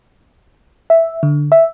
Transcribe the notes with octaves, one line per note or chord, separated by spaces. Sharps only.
E5
D3
E5